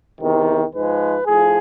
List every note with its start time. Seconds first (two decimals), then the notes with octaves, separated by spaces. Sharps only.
0.20 E2 C3 D#3
0.74 G#2 F3 G#3 B4
1.26 A2 F3 G#4